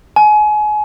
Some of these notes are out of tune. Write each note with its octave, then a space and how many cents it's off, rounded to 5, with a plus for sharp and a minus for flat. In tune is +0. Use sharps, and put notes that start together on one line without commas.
G#5 +30